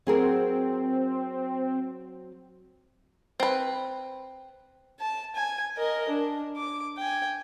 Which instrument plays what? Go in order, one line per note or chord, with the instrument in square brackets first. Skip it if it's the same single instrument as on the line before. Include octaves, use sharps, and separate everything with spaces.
[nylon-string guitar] F#3 G#4 A#4 [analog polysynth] C4
[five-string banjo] C4 B4
[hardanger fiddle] A5
G#5
A#4 D#5
D4
D6
G5 G#5